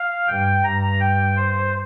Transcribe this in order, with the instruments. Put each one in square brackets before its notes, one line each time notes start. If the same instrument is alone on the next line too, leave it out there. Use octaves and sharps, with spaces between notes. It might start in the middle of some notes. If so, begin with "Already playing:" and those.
Already playing: [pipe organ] F5
[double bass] G2 [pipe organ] G5
[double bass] G2 [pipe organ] A#5
[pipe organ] G5
C5